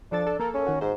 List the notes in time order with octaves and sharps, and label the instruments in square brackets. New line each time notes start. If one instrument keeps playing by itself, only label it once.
[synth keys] F3 A4 A6 [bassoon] D4
[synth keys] A4
[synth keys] A#3 A4 [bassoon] A#4
[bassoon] C#4
[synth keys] D#3 F#4
[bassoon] G#2 [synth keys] C5